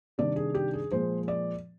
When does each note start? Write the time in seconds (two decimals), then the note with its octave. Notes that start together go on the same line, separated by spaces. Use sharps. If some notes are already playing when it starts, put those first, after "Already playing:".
0.18 C3 D#3 G3 D4 D5
0.36 G#4
0.55 G4
0.73 G#4
0.91 A#2 F3 G#3 C5
1.28 D5